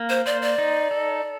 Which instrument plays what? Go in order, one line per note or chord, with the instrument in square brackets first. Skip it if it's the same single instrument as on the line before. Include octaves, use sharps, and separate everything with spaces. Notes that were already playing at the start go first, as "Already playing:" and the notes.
Already playing: [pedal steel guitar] A#3
[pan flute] C5
[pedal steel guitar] C5 [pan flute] D5
[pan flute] D5
[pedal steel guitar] D#4
A4